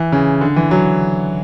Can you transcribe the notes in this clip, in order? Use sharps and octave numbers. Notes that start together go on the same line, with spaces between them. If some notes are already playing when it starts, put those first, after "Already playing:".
Already playing: E3
C#3
D3
E3
F#3